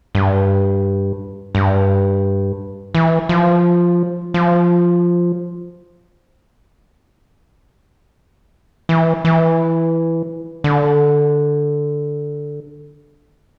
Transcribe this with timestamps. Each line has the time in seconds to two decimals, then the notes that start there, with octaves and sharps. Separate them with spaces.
0.15 G2
1.55 G2
2.95 E3
3.29 F3
4.34 F3
8.89 E3
9.25 E3
10.64 D3